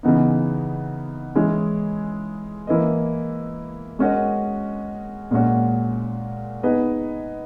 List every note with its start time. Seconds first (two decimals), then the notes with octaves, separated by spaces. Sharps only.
0.03 C#3 E3 B3 D#4
1.35 E3 G#3 C#4 E4 G#4
2.67 E3 A#3 E4 B4 D#5
3.99 G#3 C#4 F#4 A#4 D#5
5.31 A#2 G#3 C#4 F#4
6.63 B3 D#4 G#4 B4 D#5